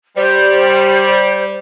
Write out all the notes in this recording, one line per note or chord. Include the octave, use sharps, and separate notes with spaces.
G3 C5